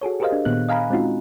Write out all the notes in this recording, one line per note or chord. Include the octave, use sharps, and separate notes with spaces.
F#4 G#4 A4 C#5
G4 G#4 A#4 C5 D#5 F5
D4
A#2 D#3 B3 F#6
D#5 F5 G#5 A#5 B5
G#3 C4 C#4 D#4 F4 F#4